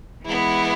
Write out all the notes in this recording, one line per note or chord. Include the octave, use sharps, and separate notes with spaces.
E3 G#3 B3 E4